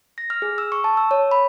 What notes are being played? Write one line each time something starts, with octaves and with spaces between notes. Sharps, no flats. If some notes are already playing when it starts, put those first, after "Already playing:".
A#6
F6
G#4
E6
C#6
A5
E6
C#5
B5